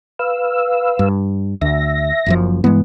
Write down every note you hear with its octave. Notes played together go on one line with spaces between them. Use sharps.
B4 F5 E6
G2
D2 E5 A#6
F#1 F#2 F3
G2 E3 G#3 B3